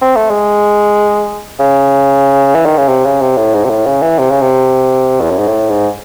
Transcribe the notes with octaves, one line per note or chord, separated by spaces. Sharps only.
C4
A3
G#3
C#3
E3
D#3
C#3
C3
C#3
C3
A2
G#2
C3
A2
C#3
E3
C3
C#3
C3
E2
F#2
G#2
A2
G#2